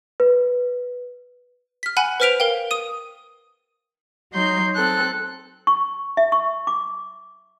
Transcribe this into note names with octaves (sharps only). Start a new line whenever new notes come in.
B4
F6 B6
F#5 G#5 B5 F#6 D#7
B4 C5 F6 B6 D7 F7
A#4 F5 G5
D#6 D#7
F#3 D#4 C6 G6
C4 A4 F#6
C#6
E5
C#6
D6